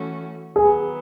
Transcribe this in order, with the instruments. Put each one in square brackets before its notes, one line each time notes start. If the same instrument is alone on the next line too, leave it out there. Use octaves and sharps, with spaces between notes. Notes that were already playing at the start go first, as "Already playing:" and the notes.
Already playing: [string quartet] E3 A3 C#4 F#4
[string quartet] D#3 F#3 B3 [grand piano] G#4